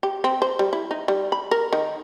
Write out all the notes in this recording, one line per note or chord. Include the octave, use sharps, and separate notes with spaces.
G4
C4
C5
G3
E4
D#4
G3
B5
A#4
D#3